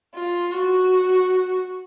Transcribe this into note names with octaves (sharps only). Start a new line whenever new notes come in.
F4
F#4